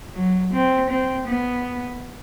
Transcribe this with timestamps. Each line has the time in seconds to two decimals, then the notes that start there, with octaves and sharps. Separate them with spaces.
0.15 F#3
0.52 C4
0.90 C4
1.27 B3